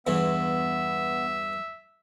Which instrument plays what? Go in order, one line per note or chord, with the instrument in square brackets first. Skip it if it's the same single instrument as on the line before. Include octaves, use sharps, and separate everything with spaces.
[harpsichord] E2 G2 E3 [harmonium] B3 [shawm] E5